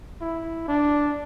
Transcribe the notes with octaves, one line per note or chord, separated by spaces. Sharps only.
E4
D4